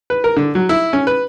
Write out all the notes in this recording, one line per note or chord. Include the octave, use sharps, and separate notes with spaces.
B4
A#4
D3
F#3
E4
C#4
B4